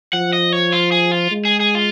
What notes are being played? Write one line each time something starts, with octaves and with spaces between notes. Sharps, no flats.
F3 F#5
D#5
C#5
F4
G#4
F4
G#3
G#4
G#4
F4